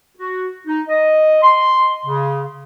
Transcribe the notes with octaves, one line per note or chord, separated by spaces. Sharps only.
F#4
D#4
D#5
C6
C#3